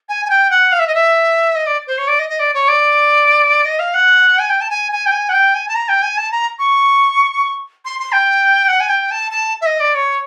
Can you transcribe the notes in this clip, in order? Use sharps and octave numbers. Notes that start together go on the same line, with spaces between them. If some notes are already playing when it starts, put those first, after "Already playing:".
G#5
G#5
G5
F#5
F5
E5
D#5
E5
D#5
D5
C5
C#5
D5
D#5
D#5
D5
C#5
D5
D#5
F5
F#5
G#5
G5
A5
G#5
G#5
G5
G#5
F#5
G5
G#5
A5
A#5
G5
G#5
A5
A#5
C#6
C6
C6
G5
F#5
G#5
G5
A5
A5
E5
D#5
D5
C#5